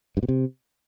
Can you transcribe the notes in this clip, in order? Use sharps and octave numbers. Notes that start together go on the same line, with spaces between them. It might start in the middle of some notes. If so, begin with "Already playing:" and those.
G2
B2
C3